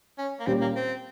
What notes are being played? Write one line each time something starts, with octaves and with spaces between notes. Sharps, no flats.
C#4
A#3
A#2 G3 C4 C#4 G4
A#3
C4